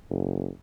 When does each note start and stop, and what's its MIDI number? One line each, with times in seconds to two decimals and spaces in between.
0.10 0.48 30